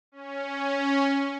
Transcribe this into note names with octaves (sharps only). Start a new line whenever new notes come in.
C#4